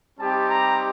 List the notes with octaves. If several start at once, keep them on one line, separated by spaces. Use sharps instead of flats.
G3 C4 D#4 G4 A5
A#5